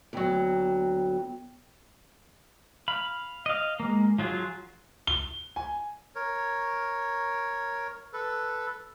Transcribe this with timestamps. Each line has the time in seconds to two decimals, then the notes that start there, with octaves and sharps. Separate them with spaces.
0.13 D2 F#3 B3 G5
2.88 F5 B5
3.46 D#5 F5
3.80 G#3 A#3
4.18 F3 F#3 F4 G#4
5.07 G7
5.56 G#5
6.15 A#4 C#5
8.13 A4 B4